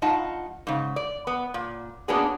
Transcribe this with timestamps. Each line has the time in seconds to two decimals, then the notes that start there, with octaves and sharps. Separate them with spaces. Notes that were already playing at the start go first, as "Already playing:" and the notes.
0.02 G2 D#4 F4 F#5 A5
0.67 G#2 C#3
0.96 D5
1.27 B3
1.54 A#2
2.08 A#3 B3 C#4 D4 F#4 G#4